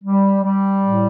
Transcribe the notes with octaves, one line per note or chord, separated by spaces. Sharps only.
G3
G3
A2